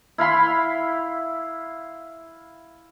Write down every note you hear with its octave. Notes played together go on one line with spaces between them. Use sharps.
E4 F5 B5 C6